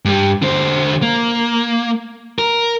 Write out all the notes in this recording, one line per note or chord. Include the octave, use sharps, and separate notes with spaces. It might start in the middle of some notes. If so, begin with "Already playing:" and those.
G2 G3
D3 C5
A#3
A#4